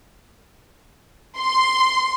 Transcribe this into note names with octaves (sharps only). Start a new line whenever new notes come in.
C6